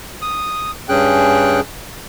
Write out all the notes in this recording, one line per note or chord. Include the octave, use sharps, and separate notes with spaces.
D#6
G2 C#4 G#4 G5 F#6